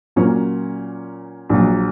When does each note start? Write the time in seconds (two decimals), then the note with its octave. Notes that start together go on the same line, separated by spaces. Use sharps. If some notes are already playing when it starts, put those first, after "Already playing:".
0.16 A#2 F#3 A#3 C#4
1.49 A#1 A#2 F#3